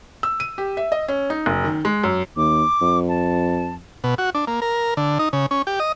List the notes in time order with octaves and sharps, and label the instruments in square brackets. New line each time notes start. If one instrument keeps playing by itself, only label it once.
[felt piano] E6
D#7
G4
E5
D#5
C#4
D#4
F#1
D#3
G#3
F#2
[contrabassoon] D#2 [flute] D6
[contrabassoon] F2
[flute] A5
[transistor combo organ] B2
F#4
D4
A#3
A#4
D3
D#4
C#3
C#4
G4
D#5